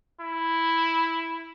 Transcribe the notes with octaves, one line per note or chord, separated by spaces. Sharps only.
E4